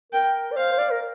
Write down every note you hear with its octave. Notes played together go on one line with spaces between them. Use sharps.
A#4 G5
D5
C5 F5
C5
D5
A#4